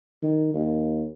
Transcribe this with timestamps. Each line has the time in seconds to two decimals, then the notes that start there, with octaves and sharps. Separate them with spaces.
0.23 D#3
0.54 D#2